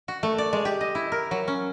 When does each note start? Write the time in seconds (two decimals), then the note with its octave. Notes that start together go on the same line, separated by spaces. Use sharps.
0.08 F#4
0.23 A3
0.38 D5
0.53 G#3
0.65 G4
0.81 D#5
0.95 E4
1.12 A#4
1.31 F#3
1.48 C#4